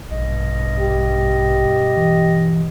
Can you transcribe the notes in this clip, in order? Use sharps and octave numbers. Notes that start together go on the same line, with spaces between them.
A#1 G2 B2 D#5
G4
E3